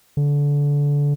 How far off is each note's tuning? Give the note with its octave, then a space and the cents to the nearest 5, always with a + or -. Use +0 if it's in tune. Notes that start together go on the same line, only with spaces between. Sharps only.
D3 -25